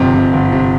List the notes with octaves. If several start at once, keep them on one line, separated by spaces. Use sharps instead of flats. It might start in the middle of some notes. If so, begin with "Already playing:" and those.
Already playing: G1 F2 C3
C3
G1
C3